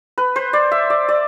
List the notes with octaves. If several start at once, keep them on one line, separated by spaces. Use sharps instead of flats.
B4
C5
D5
E5
D5
D5